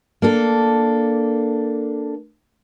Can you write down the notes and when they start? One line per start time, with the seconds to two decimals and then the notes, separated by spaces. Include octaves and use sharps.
0.22 A#3 D4 A4